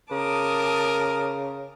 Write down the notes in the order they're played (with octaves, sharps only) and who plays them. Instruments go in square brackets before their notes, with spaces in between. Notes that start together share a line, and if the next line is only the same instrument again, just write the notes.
[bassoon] C#3 [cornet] A#4 [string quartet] A5 D6 D#6